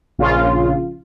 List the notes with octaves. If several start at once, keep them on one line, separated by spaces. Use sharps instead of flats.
A#1 C#3 F4